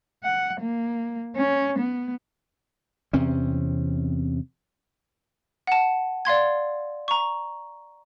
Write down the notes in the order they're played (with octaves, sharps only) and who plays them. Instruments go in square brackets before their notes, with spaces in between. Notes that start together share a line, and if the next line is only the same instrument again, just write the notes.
[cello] F#5
A#3
C#4
B3
[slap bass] E2 C3 C4 C#4
[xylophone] F#5 A5
D5 F5 C6 G#6
A#5 C#6